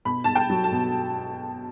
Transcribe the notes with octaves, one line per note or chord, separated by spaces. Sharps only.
B2 B5
B2 A5
G5
F#3
A5
B2